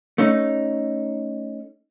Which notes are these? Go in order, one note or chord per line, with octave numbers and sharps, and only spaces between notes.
A3 C#4 D#4